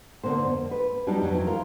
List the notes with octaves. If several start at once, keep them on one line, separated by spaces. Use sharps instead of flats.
D3 A#3 B3 C5
F2
B4
F#3 G3 B3 D4 D#4
F2 E3 F#3
F4 A#4